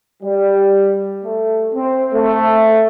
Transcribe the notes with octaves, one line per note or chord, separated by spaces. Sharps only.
G3
A3
C4
A3